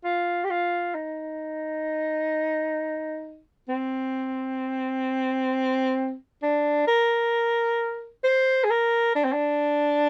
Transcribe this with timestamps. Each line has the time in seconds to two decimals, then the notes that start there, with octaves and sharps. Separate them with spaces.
0.04 F4
0.45 G4
0.50 F4
0.95 D#4
3.68 C4
6.42 D4
6.87 A#4
8.24 C5
8.64 G#4
8.70 A#4
9.15 D4
9.25 C4
9.33 D4